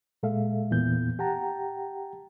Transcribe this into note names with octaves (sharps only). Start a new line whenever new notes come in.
A#2 G#3 A4 E5 F5
E2 A#2 E3 B3 G6
G4 F#5 G5 A5 A#5